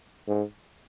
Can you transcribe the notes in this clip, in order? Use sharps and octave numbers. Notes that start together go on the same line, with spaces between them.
G#2